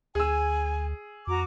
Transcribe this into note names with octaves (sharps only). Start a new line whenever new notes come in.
D2 G#4 G#5 E6
F2 F#4 A#5 D6